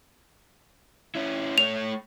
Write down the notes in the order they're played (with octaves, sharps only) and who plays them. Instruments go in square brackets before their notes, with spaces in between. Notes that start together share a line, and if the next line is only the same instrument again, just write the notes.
[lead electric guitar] C#4 E4
[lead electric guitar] A3 C#5 [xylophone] F7